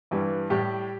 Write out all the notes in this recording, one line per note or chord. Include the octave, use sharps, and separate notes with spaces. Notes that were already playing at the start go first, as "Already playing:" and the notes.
G2 E3 G3
A2 G3 G4